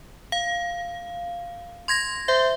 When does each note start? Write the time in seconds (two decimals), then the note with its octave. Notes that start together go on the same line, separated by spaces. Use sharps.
0.32 F5
1.88 C6 G#6 A#6
2.28 C5 E5